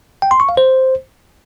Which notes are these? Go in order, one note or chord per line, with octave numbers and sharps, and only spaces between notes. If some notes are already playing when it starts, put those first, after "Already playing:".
G5
C6
C#6
F5
C5